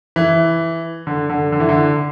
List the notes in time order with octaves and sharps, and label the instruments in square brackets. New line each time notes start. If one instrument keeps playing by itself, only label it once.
[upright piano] E3
D3
D3
D3
E3
D3